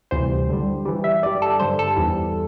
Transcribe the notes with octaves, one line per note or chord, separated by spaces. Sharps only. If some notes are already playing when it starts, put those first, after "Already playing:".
D2 C3 E3 G3 C5
G2 D3 G3
G2 E3 G3
E5
G2 G3 D5
A4
G2 D3 G3 C5
A4
E2 E3 G3